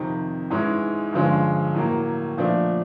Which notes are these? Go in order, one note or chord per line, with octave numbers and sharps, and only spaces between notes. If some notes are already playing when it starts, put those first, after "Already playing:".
Already playing: F2 C3 D#3
G#2 E3 G#3 C#4 E4
G2 D3 F3 G#3 C#4
A2 F#3 A#3
A#2 F3 A3 D4